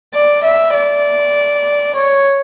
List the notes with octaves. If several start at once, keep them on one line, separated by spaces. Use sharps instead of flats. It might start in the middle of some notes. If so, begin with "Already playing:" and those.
D5
E5
D5
C#5